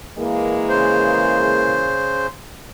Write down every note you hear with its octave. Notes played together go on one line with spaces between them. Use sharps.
E3 G#3 A#3
C#3 C5